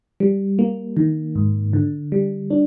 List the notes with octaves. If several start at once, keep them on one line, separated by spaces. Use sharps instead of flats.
G3
A#3
D#3
G#2
D3
G3
D4